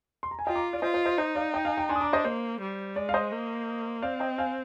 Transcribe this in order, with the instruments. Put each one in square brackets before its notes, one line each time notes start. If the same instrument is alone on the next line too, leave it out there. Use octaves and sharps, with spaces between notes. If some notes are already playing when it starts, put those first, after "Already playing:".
[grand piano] C6
A#5
G#5
[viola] F4 [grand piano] D#5 G5
[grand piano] A#5 D6
D5 F5
[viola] F4 [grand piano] C5 D#5
[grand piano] C5 D#5
C5 D#5
[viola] D#4 [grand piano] C5 D#5
[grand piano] D5 F5
D#5 G5
F5 G#5
G5 A#5
[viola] D4 [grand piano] G#5 C6
[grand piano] D#6
A#5 D6
C5 D#5
[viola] A#3 [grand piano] C5
[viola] G3
[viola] G#3 [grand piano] D5
[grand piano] F5
C5 D#5
[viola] A#3
[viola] C4 [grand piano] D5 F5
[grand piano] D#5 G5
F5 G#5